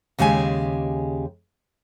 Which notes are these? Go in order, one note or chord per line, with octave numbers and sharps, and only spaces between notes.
D#2 C#3 G#3 G4 G#5